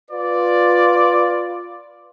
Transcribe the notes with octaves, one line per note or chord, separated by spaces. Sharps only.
F4 B4 D5